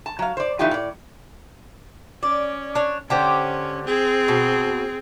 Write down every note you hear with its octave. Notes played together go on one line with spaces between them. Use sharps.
A5
F#3 F5
C5 D5
E3 A3 D#4 F4 G4
A2 D5
C#4 D5
D4 C#5
D3 C#4 G4 C5
C4 G#4
B2